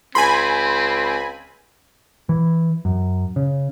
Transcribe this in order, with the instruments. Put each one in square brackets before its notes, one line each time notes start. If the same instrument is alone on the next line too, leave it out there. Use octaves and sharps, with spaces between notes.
[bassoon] C#2 [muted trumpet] C4 [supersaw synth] G#5 B5 [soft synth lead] C6
[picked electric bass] E3
F#2
C#3